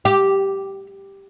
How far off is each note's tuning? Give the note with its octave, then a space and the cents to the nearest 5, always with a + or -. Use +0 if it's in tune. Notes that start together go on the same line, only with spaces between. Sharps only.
G4 -5